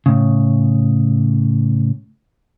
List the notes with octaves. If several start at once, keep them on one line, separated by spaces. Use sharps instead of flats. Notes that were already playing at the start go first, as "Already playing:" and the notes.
A2 C#3